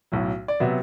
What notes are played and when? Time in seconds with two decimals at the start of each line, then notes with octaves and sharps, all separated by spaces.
0.12 B1 A2 F#3
0.48 D5
0.60 C3 F#3 B3 E5